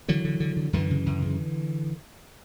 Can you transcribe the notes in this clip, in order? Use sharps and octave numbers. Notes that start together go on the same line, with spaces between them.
D3 E3 F#3
D3
D3
D3
F#2 D3 E3
C#3
F#2
C#3